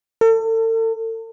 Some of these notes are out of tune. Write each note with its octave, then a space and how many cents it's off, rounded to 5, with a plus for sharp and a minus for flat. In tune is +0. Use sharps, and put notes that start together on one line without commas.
A4 +40